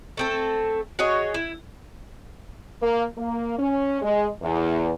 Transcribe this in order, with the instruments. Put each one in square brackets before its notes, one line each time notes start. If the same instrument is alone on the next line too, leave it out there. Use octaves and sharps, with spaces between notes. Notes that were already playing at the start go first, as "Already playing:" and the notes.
[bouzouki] A3 C4 A4
F#4 G#4 C#5 D#5
E4
[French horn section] A#3
A#3
C#4
G#3
E2